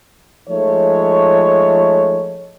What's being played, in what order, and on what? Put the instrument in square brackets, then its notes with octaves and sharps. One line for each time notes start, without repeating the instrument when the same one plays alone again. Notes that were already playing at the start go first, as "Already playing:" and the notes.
[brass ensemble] F3 G#3 A3 D#4 A4 C#5